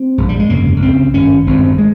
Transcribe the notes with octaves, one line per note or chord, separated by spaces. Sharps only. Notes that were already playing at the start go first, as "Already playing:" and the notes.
Already playing: C4
A#1 G#2
G3
G#3
G1 F2 C#3 A#3
C#2 C#3 C4
G#1 G2 C#4
G#1 G2 C4
G#3